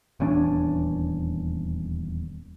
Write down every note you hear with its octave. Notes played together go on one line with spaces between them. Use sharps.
D#1 E2 C#4 D4